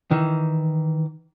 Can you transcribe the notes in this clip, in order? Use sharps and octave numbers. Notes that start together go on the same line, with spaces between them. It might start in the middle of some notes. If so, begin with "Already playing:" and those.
D#3 E3